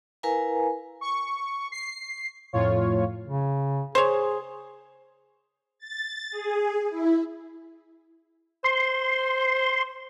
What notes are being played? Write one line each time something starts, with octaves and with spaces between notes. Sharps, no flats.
E4 A#4 B4 F5 G#5 A#5
C#6
C7
F2 A2 F4 C#5
C#3
G#4 C5 C#5
A6
G#4
E4
C5 C6